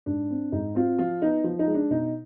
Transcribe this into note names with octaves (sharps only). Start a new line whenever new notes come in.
G#2 D4
C4
G#2 D#4
C4 F4
F3 F4
B3 D#4
F3
D#4
G#3
D4
B2 D#4